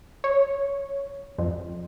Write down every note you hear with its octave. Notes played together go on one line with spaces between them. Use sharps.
C#5
F2